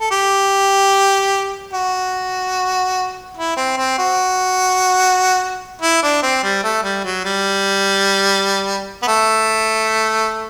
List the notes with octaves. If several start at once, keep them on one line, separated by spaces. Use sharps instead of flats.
A4
G4
F#4
E4
C4
C4
F#4
E4
D4
C4
G3
A3
G3
F#3
G3
B3
A3